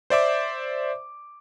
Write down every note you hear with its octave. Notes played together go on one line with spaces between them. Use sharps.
C5 D5 E5 D6